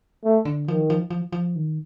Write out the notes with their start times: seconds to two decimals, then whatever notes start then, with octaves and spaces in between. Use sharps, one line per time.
0.24 A3
0.45 D3
0.68 D#3 F3
0.90 F3
1.10 F3
1.32 F3
1.56 D#3